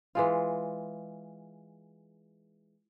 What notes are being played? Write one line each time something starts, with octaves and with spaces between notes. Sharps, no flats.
E3 G#3 F4